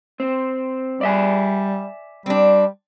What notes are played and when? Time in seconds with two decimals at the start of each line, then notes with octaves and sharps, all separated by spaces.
0.20 C4
1.01 G3 D5 E5 G#5
2.26 G3 C4 D4